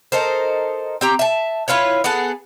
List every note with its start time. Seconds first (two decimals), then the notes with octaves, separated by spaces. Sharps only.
0.12 D#4 A4 A#4 C5
1.01 C4 G4 A#5
1.19 E5 A5
1.68 E4 F4 B4 C#5
2.04 B3 F#4 G#4 A4